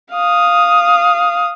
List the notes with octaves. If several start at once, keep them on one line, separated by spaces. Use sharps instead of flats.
F5 D#6